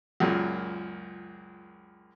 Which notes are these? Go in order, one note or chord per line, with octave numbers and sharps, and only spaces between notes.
C#2 F#2 A#2